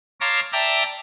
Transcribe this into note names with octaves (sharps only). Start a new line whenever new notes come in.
C#5 F5 A5 A#5 C6 D6
D5 E5 G5 A5 A#5